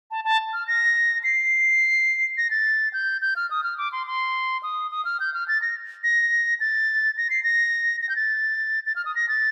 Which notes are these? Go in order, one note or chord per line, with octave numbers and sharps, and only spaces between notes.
A5
A5
F6
A#6
C7
A#6
A6
G6
G6
F6
D#6
F6
D6
C6
C6
D#6
D#6
F6
G6
F6
A6
A#6
A#6
A6
A#6
C7
A#6
A#6
G6
A6
A6
F6
D#6
A#6
A6